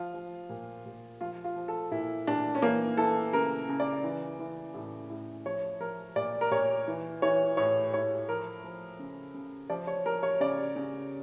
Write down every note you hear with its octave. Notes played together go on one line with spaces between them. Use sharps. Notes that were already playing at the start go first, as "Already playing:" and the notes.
Already playing: F3 F4
F3
A#2
A#2
F3 F4
F4
F3
A4
A#2 E4
A#2 D4
C#4
E3 A#3
E3 A4
C#3 A#4
C#3
D5
E3
E3
A2
A2
F3 C#5
F3 A#4
A#2 D5
A#4
A#2 C#5
E3
E3 C#5
A2 C#5
A2 C#5
F3 A#4
F3
C#3
C#3
F3 D5
C#5
F3 A#4
C#5
C#3 D5
C#3